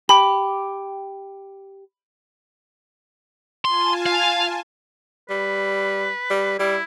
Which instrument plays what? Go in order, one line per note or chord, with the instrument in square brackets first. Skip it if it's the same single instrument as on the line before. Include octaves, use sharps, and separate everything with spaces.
[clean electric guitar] G4 [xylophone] B5
[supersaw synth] F4 G#5 A5 [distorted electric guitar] C6
[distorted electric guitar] F5
[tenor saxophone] G3 [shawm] B4
[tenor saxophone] G3
[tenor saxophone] G3 [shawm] E4